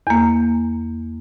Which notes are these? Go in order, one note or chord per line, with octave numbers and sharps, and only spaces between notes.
E2 A#3